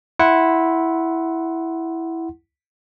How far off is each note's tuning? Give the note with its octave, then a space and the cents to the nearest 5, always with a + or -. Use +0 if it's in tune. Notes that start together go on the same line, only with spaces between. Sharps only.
E4 +0 F#5 +0 C6 +10